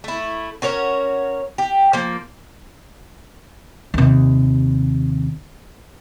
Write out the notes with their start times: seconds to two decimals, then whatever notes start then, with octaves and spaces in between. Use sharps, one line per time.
0.04 A3 E4
0.62 C#4 F#4 A#4 C#5
1.58 G4
1.93 F3 A#3
3.94 D#2 C3